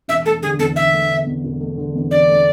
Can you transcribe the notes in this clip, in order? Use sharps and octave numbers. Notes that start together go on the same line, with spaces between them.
E1 E5
A3 A4
D3 G#4
E2 A4
E1 E5
A3
D3
E2
E1
A3
D3
E2
E1 D5
A3